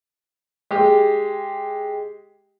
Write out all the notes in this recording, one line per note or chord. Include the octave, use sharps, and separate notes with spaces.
G#3 G4